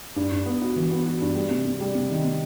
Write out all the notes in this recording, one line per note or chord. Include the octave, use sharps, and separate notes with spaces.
G2
G2
B3
F#4
E3
B3
F#4
G2
G3
C3
C3
G3
C3
D#3
C3